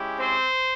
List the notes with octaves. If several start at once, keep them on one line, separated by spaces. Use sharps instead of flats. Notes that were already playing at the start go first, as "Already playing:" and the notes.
Already playing: G#3 C#4 E4 G4
C4 C5